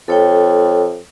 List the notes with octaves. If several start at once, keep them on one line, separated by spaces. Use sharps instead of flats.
F2 A4 C#5 G5